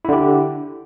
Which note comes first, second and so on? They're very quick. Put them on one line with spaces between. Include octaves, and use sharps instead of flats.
E4 D3 G4